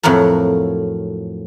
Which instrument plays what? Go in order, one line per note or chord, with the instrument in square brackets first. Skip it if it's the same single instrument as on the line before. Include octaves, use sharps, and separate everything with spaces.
[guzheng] F2 A2 F#3 F#4 A#4